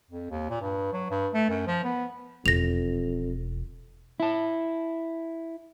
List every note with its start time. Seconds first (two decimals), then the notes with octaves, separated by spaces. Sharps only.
0.11 F2
0.30 D#2
0.50 A#2
0.62 G2
0.93 F#3
1.11 G2
1.34 A3
1.50 F#2
1.67 F3
1.84 B3
2.46 E1 F2 A#6 F7
4.20 E4 A5